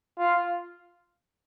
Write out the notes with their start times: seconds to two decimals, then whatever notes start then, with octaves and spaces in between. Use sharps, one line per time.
0.18 F4